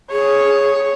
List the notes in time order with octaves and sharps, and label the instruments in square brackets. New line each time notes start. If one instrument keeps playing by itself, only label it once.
[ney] G#4 [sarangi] C#5